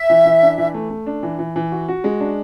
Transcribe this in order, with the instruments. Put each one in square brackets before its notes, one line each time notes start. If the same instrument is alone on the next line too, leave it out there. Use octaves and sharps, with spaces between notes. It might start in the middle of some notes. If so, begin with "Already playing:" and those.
Already playing: [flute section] E5
[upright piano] E3
E3
D4
E3
A3
A3
D4
E3
E3
E3
F#4
F#4
G#3
D4